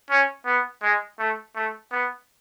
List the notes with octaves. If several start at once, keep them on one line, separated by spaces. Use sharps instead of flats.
C#4
B3
G#3
A3
A3
B3